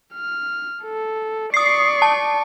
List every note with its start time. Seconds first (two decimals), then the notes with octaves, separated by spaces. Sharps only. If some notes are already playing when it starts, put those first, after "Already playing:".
0.14 F6
0.83 A4
1.54 D5 C#6 D#6 C7
2.02 A5